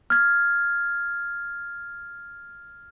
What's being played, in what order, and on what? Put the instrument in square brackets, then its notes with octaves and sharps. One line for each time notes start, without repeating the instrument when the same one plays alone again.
[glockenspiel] F6 G#6